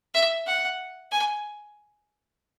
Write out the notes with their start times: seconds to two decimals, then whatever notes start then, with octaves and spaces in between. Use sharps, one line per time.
0.14 E5
0.46 F#5
1.11 G#5